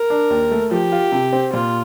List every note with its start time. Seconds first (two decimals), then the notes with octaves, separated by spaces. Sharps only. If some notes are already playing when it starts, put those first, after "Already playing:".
Already playing: A#4
0.10 D4
0.30 D#2
0.51 A3
0.71 F3 G4
0.92 F4
1.12 C3
1.33 C4
1.53 A#2 F4